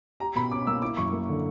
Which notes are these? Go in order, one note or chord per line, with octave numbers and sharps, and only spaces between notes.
G4 A#5
B2 B5
C#4 D6
A#3 E6
E4 D6
F#2 C#6
A#3
D3